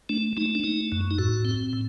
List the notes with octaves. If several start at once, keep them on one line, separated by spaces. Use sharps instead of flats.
A3 D4
A3 D#4
D4
A3 D#4
F#2
D#4
A2 F#4
C4
A2